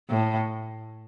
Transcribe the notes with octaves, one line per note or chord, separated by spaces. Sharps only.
A2